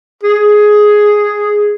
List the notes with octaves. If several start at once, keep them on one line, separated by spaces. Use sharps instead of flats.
G#4